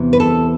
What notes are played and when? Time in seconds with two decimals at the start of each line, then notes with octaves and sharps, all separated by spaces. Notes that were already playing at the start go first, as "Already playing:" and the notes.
Already playing: E2 C3 E3 B3
0.13 B4
0.20 A4